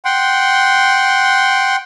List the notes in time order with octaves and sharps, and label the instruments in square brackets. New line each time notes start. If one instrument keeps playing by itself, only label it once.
[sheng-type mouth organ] F#5 G5 C6